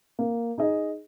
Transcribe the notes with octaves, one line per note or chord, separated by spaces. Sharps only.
A#3
D#4 G#4 D#5